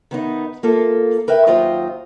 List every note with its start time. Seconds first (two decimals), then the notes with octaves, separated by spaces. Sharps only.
0.11 D#3 B3 D#4
0.63 A#3 F4 A4
1.28 A#4 B4 E5 G5
1.46 D#2 F#3 F4 C5 D#5 G5